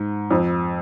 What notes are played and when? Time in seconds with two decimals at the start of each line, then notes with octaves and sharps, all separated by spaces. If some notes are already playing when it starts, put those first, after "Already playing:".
Already playing: G#2
0.31 F2